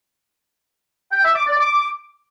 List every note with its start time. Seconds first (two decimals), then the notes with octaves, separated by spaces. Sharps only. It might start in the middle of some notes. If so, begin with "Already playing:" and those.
1.12 G5
1.24 E5
1.35 D6
1.47 D5
1.59 D6